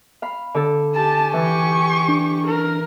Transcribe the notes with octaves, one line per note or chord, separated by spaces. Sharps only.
F5 B5
D3 A4
G4 G#5 A5
E3 C#6
D4
A#4